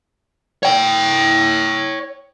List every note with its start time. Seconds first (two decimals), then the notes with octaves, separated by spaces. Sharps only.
0.63 C#5 G5